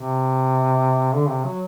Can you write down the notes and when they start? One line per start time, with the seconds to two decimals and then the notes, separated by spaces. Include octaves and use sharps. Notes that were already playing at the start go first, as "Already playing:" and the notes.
Already playing: C3
1.15 D3
1.29 C3
1.45 F#3